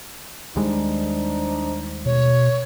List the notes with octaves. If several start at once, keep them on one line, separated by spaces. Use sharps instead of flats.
D#2 G3 G#3 D4 D#4 C5
B2 C#5